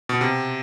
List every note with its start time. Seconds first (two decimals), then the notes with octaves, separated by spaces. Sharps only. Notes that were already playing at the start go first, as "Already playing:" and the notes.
0.09 B2
0.21 C3